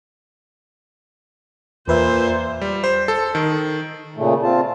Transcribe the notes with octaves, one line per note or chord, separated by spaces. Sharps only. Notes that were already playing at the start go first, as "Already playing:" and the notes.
E2 A#2 B4 C5 E5
G3
C5
A4
D#3
A#2 C#3 A3
C4 F4 A5